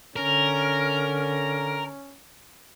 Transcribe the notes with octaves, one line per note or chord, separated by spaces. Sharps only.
D3 C#4 A#4